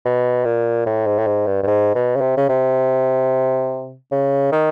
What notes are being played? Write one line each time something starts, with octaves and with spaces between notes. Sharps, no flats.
B2
A#2
A2
G#2
A2
G#2
G2
G2
G#2
B2
C#3
C3
C#3
C3
C#3
D#3